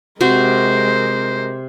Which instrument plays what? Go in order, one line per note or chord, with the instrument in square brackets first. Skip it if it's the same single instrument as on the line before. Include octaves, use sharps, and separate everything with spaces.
[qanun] C3 F#4 G5 [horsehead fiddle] G#3 A#4 [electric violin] C5